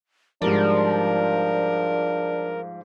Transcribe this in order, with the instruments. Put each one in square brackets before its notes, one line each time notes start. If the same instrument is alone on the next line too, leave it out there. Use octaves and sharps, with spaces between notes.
[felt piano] G#2 G3 D5 [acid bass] F3 [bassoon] D4 [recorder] A#4